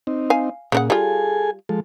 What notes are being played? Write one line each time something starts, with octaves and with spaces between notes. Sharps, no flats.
C4 D#4
F5 G#5
A#2 C#3 D4 F#5
G3 F4 G#4 A4 G#5
F3 G#3 A4